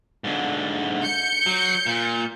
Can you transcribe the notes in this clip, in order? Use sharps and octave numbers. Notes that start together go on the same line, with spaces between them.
G#2 D3
G6 C#7
F#3
A#2